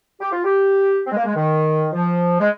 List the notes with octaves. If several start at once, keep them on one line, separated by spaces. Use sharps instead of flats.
G4
F4
G4
C4
G#3
A#3
G#3
D#3
F3
G#3